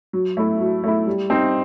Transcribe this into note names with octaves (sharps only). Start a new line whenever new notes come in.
F#3
A3 E4
F#3
A3 E4
G3
C4 D#4